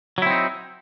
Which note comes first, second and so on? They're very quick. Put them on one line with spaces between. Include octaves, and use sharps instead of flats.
F#3 E4 C4 D#4